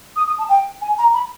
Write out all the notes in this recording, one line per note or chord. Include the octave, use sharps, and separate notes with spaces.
D#6
D#6
A5
G5
G#5
A#5
B5